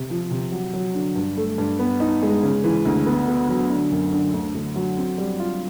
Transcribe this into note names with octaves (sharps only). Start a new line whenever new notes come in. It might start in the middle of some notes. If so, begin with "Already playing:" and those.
Already playing: C3
F3
C3
F#3
F#3
D3
G2
A3
G2
B3
D#4
G#3
C#3
E3
D2
B3
B3
F#3
D3
F#2
D3
D2
D2
F#3
C4
G3
F4